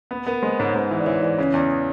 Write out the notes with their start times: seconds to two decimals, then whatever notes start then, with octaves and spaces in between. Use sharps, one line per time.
0.11 B3 B4
0.26 B3 A#4
0.42 G#3 C5
0.59 G#2 C#5
0.75 G#2 C5
0.91 E3
1.00 D5
1.06 E3 C#5
1.23 E3 D5
1.38 C#3 C#5
1.54 E2 D5